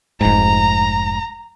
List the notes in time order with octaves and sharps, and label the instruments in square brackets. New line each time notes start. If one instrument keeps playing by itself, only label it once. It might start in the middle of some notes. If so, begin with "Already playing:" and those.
[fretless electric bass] F1 G#2 [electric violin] A#5